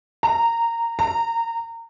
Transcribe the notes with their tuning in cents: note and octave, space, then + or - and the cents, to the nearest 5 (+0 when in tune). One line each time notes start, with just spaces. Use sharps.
A#5 -10
A#5 -20